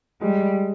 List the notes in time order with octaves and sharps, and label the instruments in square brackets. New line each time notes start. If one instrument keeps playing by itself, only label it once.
[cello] G3 [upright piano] G#3